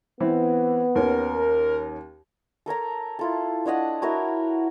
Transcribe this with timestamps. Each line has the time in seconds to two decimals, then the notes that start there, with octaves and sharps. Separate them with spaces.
0.20 E3 B3 C4 E4
0.95 D#2 C#4 A#4
2.66 A4 A#4 C#5 A#5
3.19 E4 F4 A4
3.66 D4 C#5 D#5 F#5
4.02 E4 F#4 A#4 C#5